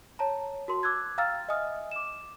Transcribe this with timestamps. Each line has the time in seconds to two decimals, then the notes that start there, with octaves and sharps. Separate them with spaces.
0.19 C#5 A5 A#5
0.68 F#4 A#4 C6
0.83 D6 E6 F#6 G#6
1.18 F5 G5 A#5 E6 F6 A6
1.49 D#5 E5 G#5 D#6 F6
1.92 D6 E7